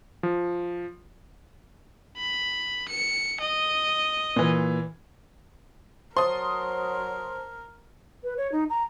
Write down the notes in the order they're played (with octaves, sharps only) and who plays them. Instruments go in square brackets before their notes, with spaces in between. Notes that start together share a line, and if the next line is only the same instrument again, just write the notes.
[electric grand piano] F3
[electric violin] B5
C#7
D#5
[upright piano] A#2 E3
[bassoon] F#3 [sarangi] A#4 [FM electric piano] C5 A5 [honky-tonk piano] C6 D#6
[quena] B4
C#5
D#4
A#5